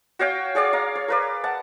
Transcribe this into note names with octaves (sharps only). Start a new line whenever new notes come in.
F#4 C#5 F5 G5
G#4 C#5 D5 F5
F5 A#5
C#5
A#4 B4 D5
F#5 A5